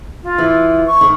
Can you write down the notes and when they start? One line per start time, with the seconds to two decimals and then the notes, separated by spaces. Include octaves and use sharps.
0.24 F4
0.38 E3
0.86 C#6
1.01 D#3